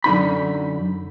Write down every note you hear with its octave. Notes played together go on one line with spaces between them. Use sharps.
F#2 D3 D#4 B5